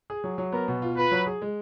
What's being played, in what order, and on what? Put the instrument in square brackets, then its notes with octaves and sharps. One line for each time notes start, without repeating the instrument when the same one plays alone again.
[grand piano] G#4
F#3
F#3
[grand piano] B3 [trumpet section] A#4
[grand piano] B2
F4
[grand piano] F4 [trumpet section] B4
[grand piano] F#3
G#4
G#3